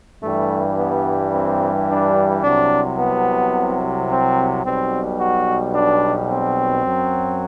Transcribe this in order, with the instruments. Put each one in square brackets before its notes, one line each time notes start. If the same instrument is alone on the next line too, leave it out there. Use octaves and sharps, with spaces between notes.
[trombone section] G2 E3 G3 A3
B3
C4
D4
C2 C3 F#3 D4
B3
C4
B1 B2 G3 C4
F#4
D4
C4
F#2 F#3